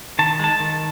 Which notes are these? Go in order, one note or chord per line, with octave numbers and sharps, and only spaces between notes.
D#3 A5
G#3 A5
D#3